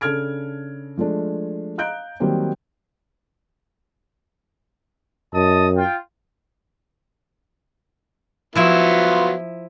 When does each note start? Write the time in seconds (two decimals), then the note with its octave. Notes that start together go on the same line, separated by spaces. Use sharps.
0.01 C#3 D4 A4 F6 G#6 D7
0.97 F3 G#3 A3 D4
1.78 D#5 F5 A#5 F#6 G6 D7
2.20 D#3 F#3 G3 A#3 C4
5.34 F#2 D#5 A5 D#6
5.76 F4 G5
8.55 F3 F#3 B3 E4 F4 E5